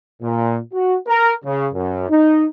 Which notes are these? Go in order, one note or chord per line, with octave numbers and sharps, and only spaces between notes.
A#2
F#4
A#4
C#3
F#2
D#4